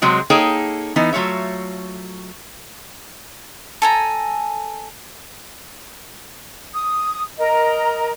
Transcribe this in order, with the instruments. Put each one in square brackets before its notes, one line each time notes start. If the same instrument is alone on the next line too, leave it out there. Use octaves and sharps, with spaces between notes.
[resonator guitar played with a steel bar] C3 F#3 G#3 C4
A#3 D#4 G#4 A4 C#5 G5
E3 B3 D#4
F#3 A3 F4 C#5 E5
[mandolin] A4 G#5 A#5
[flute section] D#6
A#4 D#5 A#5